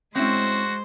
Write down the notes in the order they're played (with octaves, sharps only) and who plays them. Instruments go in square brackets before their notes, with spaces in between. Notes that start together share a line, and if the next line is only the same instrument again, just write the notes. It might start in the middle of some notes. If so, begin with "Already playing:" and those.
[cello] G#3 C5 [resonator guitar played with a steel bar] C4 C#4 E4 [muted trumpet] F#4